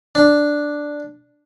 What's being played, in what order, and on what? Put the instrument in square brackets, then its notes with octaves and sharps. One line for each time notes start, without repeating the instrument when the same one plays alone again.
[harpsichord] D4